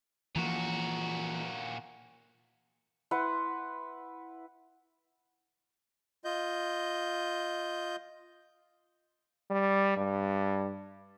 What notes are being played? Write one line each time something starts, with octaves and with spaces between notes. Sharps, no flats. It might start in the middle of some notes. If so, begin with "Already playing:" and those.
A#2 E3 F3 A#3 F#4
E4 B4 F#5 C6
F4 D#5 G6
G3
G2